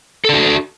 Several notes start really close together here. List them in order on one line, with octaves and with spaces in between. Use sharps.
A4 D4 F#4